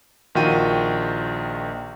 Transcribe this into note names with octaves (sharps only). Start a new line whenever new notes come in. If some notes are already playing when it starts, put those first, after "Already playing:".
A#1 D#3 F4 F#4 G5 D#7